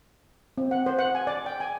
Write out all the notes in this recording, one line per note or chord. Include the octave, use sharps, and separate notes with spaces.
C4
F#5
C5
F#5
G#5
D5
G5
G#5